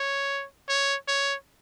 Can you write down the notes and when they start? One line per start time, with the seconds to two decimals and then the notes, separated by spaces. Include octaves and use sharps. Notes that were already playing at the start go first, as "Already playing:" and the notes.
Already playing: C#5
0.69 C#5
1.08 C#5